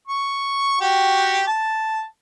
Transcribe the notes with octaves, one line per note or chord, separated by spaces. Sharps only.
C#6
F#4 G4
A5